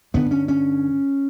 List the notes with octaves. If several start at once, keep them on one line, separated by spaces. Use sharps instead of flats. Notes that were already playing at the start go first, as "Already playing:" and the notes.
G2 D3 B3
C#4
C#4